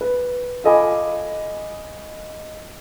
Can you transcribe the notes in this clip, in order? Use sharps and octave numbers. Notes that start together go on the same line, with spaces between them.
B4
F4 A4 D#5 G#5 B5 D6